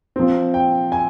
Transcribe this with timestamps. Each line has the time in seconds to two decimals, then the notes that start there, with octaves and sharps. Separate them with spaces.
0.16 F3 C4
0.54 G5
0.92 G#5